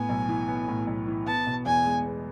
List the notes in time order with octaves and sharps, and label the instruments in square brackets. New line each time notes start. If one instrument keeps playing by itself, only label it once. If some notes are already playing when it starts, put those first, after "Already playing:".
Already playing: [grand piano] A2 B3 [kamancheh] G#5
[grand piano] B1
E3
B3
A2
B1
E3
[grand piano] B3 [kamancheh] A5
[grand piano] B2
[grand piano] E2 [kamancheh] G#5
[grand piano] G#3
B3